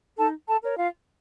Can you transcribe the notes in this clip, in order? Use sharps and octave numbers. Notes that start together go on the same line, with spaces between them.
D#4 A4 A5
A4 A5
A#4 C#5
F4 F5